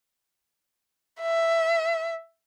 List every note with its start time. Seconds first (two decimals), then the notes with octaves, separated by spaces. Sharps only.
1.21 E5